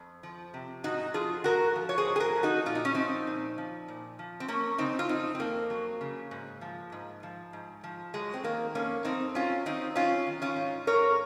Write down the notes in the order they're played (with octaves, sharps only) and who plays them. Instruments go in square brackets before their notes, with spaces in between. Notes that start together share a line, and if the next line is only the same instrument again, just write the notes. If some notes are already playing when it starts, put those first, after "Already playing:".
Already playing: [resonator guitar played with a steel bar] F2
F3
C3
G#2 D#4 F#4
F3 F4 G#4
G#2 F#4 A#4
F3
C#5
G#4 C5
G#2
G#4
F#4 A#4
F3
D#4 F#4
A#2 F4
D#4
C#4
F3 C4 D#4
A#2
F3
A#2
F3
C4
F#3 A#3 C#4
C#3 C4 D#4
F4
F2 C4 D#4
C4
F2 A#3
F#3
C#3
G#2
F3
G#2
F3
G#2
F3
F#3 G#3
C4
D#3 A#3
F2 A#3 C#4
F2 C4 D#4
F#3 C#4 F4
D#3 C4 D#4
F#3 C#4 F4
D#3
C#4 F4
G#2
G#2 A#4 C#5